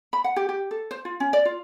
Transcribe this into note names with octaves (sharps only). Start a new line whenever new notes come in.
B5
F#5
G4
G4
A4
C5
F4
C#4
D5
F4